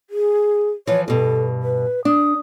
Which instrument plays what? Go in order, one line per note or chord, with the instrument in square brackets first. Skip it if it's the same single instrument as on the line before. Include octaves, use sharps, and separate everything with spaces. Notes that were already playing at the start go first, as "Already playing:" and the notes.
[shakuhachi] G#4
[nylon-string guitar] E3 F3 [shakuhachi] C#5
[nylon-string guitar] G2 B2 [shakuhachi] A4
[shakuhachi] B4
[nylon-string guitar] D4 [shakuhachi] D#6